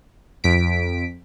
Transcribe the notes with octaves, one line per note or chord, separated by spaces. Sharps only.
F2 B6 D7